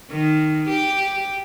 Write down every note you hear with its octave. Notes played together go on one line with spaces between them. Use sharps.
D#3
G4